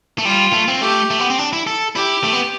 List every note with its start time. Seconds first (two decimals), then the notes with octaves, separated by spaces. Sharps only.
0.18 A3
0.25 G3 F4
0.53 A3
0.68 C4
0.81 A3 G4
1.10 A3
1.20 B3
1.30 C4
1.39 D4
1.53 E4
1.67 A4
1.95 E4 G4
2.24 A3
2.33 B3